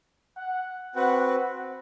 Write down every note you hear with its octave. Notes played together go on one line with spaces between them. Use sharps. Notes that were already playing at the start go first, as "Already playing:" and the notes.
F#5
C4 F#4 B4 F#5
F#5